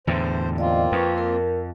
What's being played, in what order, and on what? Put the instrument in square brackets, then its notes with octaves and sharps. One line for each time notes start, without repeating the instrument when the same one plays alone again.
[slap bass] E2 A2 D3 [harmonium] C5
[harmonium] A#3 C4 F4 [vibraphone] D5 D#5 F5
[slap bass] F2 [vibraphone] B4 C#6
[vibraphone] A#4